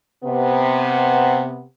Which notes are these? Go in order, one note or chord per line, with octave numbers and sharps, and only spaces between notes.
C3 B3